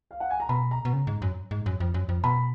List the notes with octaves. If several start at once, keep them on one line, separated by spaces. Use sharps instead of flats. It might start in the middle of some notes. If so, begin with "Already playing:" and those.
F5
F#5
G#5
A#5
B2 B5
A#5
B2
C#3
G#2
F#2
G#2
F#2
F2
F#2
F2
B2 B5